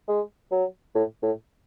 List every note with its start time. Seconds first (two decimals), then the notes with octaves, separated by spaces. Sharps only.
0.08 G#3
0.51 F#3
0.95 A2
1.22 A2